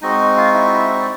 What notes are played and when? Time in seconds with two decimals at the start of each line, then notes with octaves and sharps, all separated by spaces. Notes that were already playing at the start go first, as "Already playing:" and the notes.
0.01 G#3 C4 D#4 F#4 D#5
0.37 F4 F5
0.54 E4 E5
1.01 D5